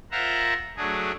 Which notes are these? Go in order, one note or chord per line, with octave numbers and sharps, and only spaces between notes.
F4 A#4 C5 E5 F#5 A#5
F#3 A3 D4 G#4